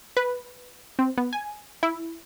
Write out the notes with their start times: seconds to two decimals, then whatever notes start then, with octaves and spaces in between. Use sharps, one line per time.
0.17 B4
0.99 C4
1.18 B3
1.33 G#5
1.83 E4